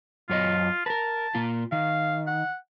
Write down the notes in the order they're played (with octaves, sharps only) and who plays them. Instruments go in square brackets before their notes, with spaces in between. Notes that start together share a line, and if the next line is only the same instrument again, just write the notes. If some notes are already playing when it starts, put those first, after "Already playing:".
[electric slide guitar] F#2 C#5 D#5 [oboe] F4
[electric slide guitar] A#4 B4 [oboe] A5
[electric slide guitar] A#2 A#3 F4
[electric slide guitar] D#3 [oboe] F5
[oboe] F#5